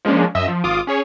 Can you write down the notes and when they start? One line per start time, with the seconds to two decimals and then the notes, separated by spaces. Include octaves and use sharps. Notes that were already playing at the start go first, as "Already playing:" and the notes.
0.05 F3 G#3 A#3 C#4 D4
0.35 F#2 D#5 E5 E6
0.48 F3
0.64 G#1 F4 D6 D#6
0.87 C#4 G#4 C#5